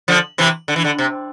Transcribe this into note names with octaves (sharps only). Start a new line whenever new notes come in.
D3 F3
C3 E3
D3
E3
D3
C3